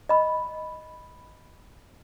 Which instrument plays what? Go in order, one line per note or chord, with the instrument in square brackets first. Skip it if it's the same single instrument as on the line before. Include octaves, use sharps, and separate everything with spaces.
[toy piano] D#5 B5